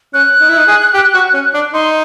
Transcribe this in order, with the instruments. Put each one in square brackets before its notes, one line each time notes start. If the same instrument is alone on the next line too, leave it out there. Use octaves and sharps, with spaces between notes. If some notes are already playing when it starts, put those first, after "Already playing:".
[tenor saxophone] C#4 [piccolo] F#6
[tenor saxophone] D#4
E4
D#4
G#4
G4
F#4
C#4
D4
[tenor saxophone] D#4 [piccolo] C6